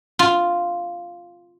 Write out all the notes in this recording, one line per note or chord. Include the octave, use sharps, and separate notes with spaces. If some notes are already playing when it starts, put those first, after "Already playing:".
F4